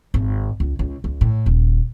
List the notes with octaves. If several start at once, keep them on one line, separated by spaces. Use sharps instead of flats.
G#1
C#2
C#2
C#2
A2
D#1